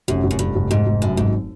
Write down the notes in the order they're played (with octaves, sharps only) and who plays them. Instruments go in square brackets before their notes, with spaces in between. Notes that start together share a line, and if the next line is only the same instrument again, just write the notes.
[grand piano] F1 [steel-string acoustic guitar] F#2
[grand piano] F1
[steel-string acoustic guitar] F#2
[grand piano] F1 [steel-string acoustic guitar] G2
[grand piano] F1
[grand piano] F1 [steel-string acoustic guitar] G#2
[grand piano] F1
[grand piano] F#2 [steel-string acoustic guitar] A2
[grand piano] G#1 [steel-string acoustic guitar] G#2